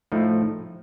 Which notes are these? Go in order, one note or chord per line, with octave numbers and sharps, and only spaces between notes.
A2 F3 A3 D#4